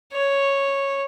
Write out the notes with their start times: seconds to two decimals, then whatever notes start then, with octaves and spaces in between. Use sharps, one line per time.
0.13 C#5